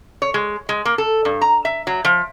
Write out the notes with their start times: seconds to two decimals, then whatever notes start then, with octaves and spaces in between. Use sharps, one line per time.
0.22 C#5
0.34 G#3
0.69 G#3
0.85 A#3
0.98 A4
1.25 G2
1.41 A#5
1.65 E5
1.87 F#3
2.05 F3